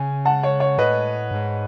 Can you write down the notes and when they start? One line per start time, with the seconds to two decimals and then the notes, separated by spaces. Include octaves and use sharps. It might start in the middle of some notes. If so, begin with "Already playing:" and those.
Already playing: C#3 G#5
0.25 F#5 A5
0.43 C#5
0.60 C#5
0.78 A2 B4 D#5
1.31 G#2